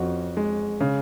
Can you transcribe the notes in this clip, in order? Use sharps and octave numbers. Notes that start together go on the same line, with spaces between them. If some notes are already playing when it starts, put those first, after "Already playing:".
Already playing: F2 C#4 F#4
G#3
C#3